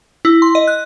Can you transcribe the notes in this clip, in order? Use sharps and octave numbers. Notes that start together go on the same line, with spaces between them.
E4
C6
D#5
F#6